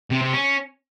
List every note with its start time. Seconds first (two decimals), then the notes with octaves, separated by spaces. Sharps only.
0.11 C3
0.22 C3
0.34 C#4